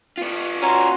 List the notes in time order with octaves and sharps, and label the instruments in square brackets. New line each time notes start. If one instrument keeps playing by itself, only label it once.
[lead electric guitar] B3 F4
[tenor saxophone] C#4 [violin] F#4 C6 [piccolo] A#5